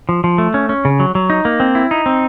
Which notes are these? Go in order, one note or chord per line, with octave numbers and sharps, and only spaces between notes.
F3
F3
A3
C#4
C#4
C#3
F#3
F#3
D#4
A#3
C4
E4
D#4
C4